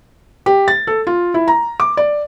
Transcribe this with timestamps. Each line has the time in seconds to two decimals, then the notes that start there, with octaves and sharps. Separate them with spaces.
0.46 G4
0.68 A6
0.87 A4
1.07 F4
1.34 E4
1.48 A#5
1.80 D6
1.97 D5